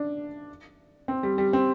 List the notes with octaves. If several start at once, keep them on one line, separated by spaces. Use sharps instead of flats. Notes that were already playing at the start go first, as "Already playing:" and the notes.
Already playing: D4
C4
G3
G3
C4